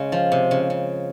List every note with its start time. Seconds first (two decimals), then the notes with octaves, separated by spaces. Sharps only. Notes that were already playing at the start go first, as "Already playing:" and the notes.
Already playing: C#3 G#3
0.12 F3
0.32 C3
0.51 C#3
0.70 C#3